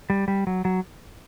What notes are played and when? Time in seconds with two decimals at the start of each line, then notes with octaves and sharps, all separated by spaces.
0.10 G3
0.28 G3
0.47 F#3
0.65 F#3